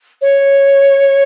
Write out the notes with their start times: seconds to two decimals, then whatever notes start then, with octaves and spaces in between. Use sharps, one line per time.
0.22 C#5